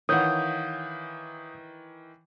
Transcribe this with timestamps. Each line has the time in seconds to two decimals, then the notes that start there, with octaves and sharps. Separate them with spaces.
0.09 D#3 E3 C#5 F5 F#5 D#6 G6